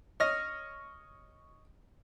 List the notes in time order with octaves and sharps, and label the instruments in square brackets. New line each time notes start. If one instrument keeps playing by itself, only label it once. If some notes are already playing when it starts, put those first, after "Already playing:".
[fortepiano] C#5 D#5 [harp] F6 A#6